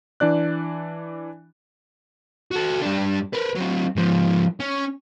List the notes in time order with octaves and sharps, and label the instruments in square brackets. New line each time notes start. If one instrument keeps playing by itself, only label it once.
[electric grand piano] E3 D4 D5 F#6
[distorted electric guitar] F#4 A4
G2 D4
A#4 B4
F#3 C4
G#2 F3
C#4